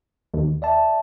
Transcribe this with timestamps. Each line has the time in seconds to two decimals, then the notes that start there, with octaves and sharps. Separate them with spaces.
0.34 D#2
0.62 D5 E5 A5